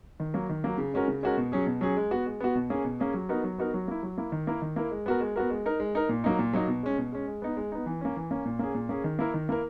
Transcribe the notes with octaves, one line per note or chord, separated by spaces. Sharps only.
D#3
F#3 A#3
D#3
F#3 A#3
C#3
G#3 C#4 F#4 A#4
C#3
G#3 C#4 F#4 A#4
B2
F#3 C#4 G#4
B2
F#3 C#4 G#4
G#3
B3 F#4
G#3
B3 F#4
B2
A#3 C#4 G#4
B2
A#3 C#4 G#4
F#3
B3 D#4 F#4 A#4
F#3
B3 D#4 F#4 A#4
F#3
A#3 E4
F#3
A#3 E4
D#3
A#3 E4 A#4
D#3
A#3 E4 A#4
G#3
B3 F#4 A#4
G#3
B3 F#4 A#4
G#3
D#4 A#4
G#3
D#4 A#4
A#2
F#3 A#3 D#4
A#2
F#3 A#3 D#4
B2
G#3 C#4
B2
G#3 C#4
G#3
B3 D#4
G#3
B3 D#4
E3
A#3 C#4
E3
A#3 C#4
A#2
A#3 C#4 G#4
A#2
A#3 C#4 G#4
D#3
A#3 E4 A#4
D#3
A#3 E4 A#4